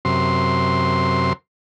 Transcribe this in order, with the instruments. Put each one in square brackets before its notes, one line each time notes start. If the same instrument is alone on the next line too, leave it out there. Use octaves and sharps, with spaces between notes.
[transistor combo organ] F#2 C3 C6